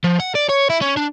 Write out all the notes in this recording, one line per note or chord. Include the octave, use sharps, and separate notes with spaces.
F3
F#5
D5
C#5
E4
C#4
D4